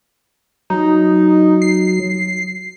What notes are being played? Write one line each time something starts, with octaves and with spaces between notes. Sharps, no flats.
F#3 D#4
C7